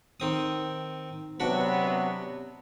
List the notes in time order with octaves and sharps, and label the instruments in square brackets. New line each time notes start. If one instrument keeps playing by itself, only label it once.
[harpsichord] D#3 C4 D#6
[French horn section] C3 F#3 B3 [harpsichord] D4 F#4 B5